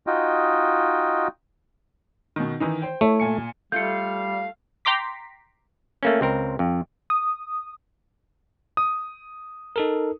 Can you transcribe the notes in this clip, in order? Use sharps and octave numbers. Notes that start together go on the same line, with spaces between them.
D#4 F4 F#4 D#5 G5
B2 D#3
D#3 E3 D#4
C5 G5
A3 E4 C#5
A#2 G#5 C#7
G3 A3 F4 A4 F5 G6 C#7
G5 A#5 C6 D6 B6
A3 A#3 C#4
C#2 C4 A#4
F2
D#6
D#6
D#4 A4 A#4